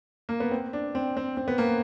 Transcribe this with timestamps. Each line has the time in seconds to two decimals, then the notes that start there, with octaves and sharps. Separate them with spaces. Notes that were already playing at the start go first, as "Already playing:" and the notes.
0.29 A#3
0.40 B3
0.51 C4
0.73 D4
0.95 C4
1.17 C4
1.37 C4
1.48 B3
1.58 A#3